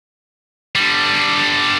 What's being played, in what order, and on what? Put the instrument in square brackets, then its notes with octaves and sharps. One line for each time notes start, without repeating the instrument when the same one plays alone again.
[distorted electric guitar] D3 G3